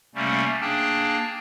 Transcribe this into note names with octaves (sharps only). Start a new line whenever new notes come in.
C3 G3 A3 A#3 C#4
A#3 D4 G#4 G5 A5